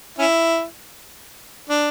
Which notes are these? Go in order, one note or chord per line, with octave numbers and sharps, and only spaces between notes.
C#4 E4
D4